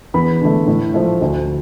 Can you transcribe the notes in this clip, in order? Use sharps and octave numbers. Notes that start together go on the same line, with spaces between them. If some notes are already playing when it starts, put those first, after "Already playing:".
E2 B5
D3 A3
A2
F3 A3
D2